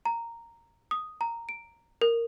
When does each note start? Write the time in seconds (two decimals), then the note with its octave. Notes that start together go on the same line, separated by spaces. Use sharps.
0.05 A#5
0.91 D#6
1.21 A#5
1.49 D7
2.02 A#4